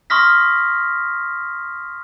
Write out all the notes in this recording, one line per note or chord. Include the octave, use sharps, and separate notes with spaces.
C6 C#6 D#6 F6 A#6 B6